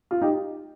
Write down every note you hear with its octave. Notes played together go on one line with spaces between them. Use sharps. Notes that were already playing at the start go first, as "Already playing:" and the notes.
F4
D#4 G4